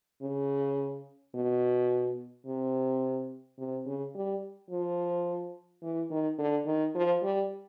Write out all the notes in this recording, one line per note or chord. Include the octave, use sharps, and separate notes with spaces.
C#3
B2
C3
C3
C#3
G3
F3
E3
D#3
D3
D#3
F3
G3